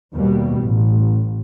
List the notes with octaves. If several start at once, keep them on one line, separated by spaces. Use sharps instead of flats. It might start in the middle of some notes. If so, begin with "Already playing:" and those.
D#2 B2 G3
A1